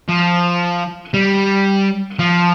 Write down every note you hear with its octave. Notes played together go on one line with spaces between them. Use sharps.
F3
G3
F3